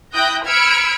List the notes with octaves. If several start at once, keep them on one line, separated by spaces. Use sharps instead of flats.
E4 G5 D#6 F#6 G6 A#6
B5 E6 F6 G#6 C#7 D7